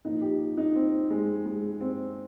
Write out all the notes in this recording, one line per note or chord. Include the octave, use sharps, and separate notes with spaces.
A#2 F3 D#4
G4
D#4
C4
G#3
G#3
C4